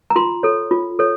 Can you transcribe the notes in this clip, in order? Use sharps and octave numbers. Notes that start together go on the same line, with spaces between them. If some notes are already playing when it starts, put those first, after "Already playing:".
A#5
F4 C6
A4 C#5
F4
A4 C#5